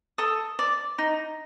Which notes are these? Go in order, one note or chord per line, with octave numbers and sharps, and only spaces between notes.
A4 D#6
D5
D#4